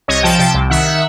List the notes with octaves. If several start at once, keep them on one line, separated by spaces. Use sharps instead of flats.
C2 C#5 D#5
F3 G5 A5
C3 G5 A5
C2
D#3 E5 F#5